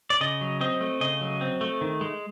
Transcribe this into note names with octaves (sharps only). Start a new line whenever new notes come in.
D5
C#3 D#5
F#3
C4 D#5
A3
C#3 D#5
F#3
C4
A3
D#3
G#3